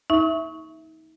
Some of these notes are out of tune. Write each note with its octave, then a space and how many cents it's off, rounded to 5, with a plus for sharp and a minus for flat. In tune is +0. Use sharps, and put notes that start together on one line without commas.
D#4 +35 E5 +0 C#6 +0